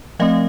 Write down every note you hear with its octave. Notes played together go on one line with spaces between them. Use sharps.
F3 A3 C4 D#5 F5